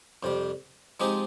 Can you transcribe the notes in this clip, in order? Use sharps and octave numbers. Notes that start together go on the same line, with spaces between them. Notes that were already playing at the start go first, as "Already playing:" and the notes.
F2 C3 G3
F3 G#3 C4 D#4 G4